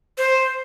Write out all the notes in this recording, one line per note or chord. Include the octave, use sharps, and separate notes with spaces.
C5